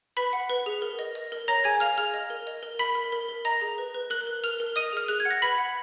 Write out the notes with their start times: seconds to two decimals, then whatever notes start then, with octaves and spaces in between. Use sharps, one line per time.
0.17 B4 B5 B6
0.33 F#5
0.50 B4
0.66 G#4
0.82 A#4
0.99 D#5
1.15 D#5
1.32 A#4
1.48 C#5 A#5 A#6
1.64 G#4 G#5 G#6
1.80 F5 F6 F7
1.97 G#4 F6 F7
2.14 D#5
2.30 A#4
2.47 D#5
2.63 A#4
2.79 A#4 B5 B6
2.95 A#4
3.12 A#4
3.28 A#4
3.45 D#5 A#5 A#6
3.61 G#4
3.78 B4
3.94 B4
4.10 A#4 F#6 F#7
4.27 A#4
4.43 A#4 F6 F7
4.60 A#4
4.76 D#5 D#6 D#7
4.93 G#4 F6
5.08 G#4 F#6
5.20 G#6
5.25 F#5
5.30 A#6
5.42 B4 B5 B6
5.58 F#5